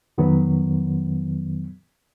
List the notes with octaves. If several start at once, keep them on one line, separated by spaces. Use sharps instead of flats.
F2 D#3 F#3 B3